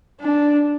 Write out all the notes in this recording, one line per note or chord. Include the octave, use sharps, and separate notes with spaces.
D4